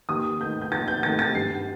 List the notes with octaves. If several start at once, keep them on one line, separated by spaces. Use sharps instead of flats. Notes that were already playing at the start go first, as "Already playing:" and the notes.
D#2 D#6
D#3 A3 G6
G6
D#2 A6
G6
D#3 A3 A6
A6
G2 C7